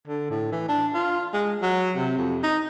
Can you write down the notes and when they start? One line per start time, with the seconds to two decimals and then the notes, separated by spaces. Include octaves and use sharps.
0.08 D3
0.30 A2
0.52 E3
0.68 D4
0.94 F4
1.33 G#3
1.62 F#3
1.96 C3
2.18 F2
2.43 D#4